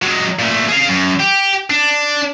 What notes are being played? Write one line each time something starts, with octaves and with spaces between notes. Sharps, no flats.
F#3 G#3
A#2 A3
G#4 F5
F#2
G4
D4